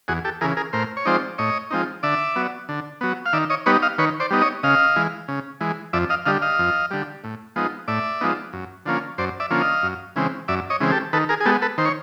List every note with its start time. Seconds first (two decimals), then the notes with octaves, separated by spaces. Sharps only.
0.08 E2 F#4 G#4
0.24 G4 A4
0.41 C#3 E3 G#4 A#4
0.57 G#4 A#4
0.73 A2 A#4 C5
0.97 C#5
1.05 F3 G#3 C4 D#4 C5 D5
1.38 A2 C#5 D#5
1.70 F3 G#3 C4 D#4
2.03 D3 D5 E5
2.36 F#3 B3
2.69 D3
3.01 F#3 B3
3.26 F5
3.33 D#3 D5 E5
3.50 C#5 D#5
3.66 G3 B3 D#4 B4 C#5
3.82 D#5 F5
3.98 D#3 B4 C#5
4.20 C5 D5
4.31 G3 B3 D#4
4.41 C#5 D#5
4.63 C#3 D#5 F5
4.96 E3 G#3
5.28 C#3
5.61 E3 G#3
5.93 F2 D5 E5
6.10 D#5 F5
6.26 D3 G3 D#5 F5
6.42 D#5 F5
6.59 F2
6.91 D3 G3
7.24 A2
7.56 F3 G#3 B3 D#4
7.88 A2 D5 E5
8.21 F3 G#3 B3 D#4
8.53 F#2
8.86 D3 F3 A#3 C#4
9.18 F#2 C5 D5
9.40 D5 E5
9.50 D3 F3 A#3 C#4
9.61 D#5 F5
9.83 F#2
10.16 C#3 E3 G#3 C4
10.48 F#2 D5 E5
10.70 C#5 D#5
10.80 C#3 E3 G#3 C4
10.92 G4 A4
11.13 D#3 A4 B4
11.29 G#4 A#4
11.40 G#4
11.45 G#3 B3 G4 A4
11.62 A4 B4
11.78 D#3 C5
11.85 C#5